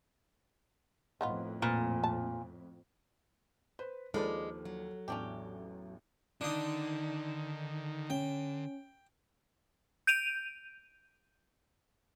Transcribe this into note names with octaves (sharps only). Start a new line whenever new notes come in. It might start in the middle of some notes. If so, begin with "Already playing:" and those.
F2 A2 D#3 B3 F4
A#2 B4
A5
B4 C5
D#2 D#3 F3 G#3 D4 A4 B4 D5
F#3
A1 E2 C#4 D4 G4
D3 D#3 D4 D#4
C#4 G5
G6 D7 D#7 F7